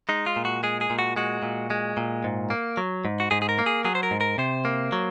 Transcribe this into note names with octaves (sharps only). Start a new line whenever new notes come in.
G#3 D#4
F4
A#2
F#4
G#3 G#4
G#4
A#2
F#4
G#3 F#4
A#2
G#3
A#2
G#2
A#3
F#3
G#2
F#4
G#2 G#4
G#4
A#4
A#3
G#4
F#3 G#4
C5
A#4
G#2
A#4
C3 C5
A#3
F#3